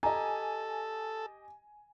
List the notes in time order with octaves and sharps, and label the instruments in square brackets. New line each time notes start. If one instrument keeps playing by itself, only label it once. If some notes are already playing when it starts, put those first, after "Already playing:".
[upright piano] G4 D#5 [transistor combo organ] A4 [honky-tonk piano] G#5 [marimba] A#5